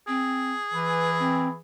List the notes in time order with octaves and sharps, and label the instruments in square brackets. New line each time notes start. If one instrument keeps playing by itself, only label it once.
[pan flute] C4 [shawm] G#4
[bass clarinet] E3 [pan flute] B4
[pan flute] C4